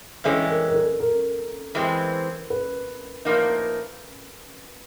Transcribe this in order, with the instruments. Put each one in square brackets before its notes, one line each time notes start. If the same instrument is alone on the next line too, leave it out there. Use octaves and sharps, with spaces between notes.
[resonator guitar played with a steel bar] G2 E3 G#3 C#4 [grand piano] A4
[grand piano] A#4
A#4
A4
A#4
[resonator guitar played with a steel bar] E3 G#3 C4
[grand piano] B4
[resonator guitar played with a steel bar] A2 F3 A#3 D#4